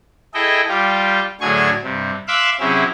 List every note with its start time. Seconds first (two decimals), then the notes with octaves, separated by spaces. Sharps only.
0.34 E4 G#4 A4 D#5 G5
0.69 G3 F4 G4
1.41 A2 D3 F#3 G#4 G#5 C#6
1.83 G2 C3
2.28 E5 F5 C6 D6 E6 F#6
2.60 C3 F#3 C#4 E4 G#4